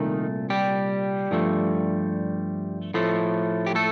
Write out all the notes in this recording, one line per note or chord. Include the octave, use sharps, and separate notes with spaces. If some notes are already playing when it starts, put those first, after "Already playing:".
Already playing: C2 A#2 D#3 A3 D#4
G3 G4
G2 F3 A3
A2 F3 A3
G4
A3 A4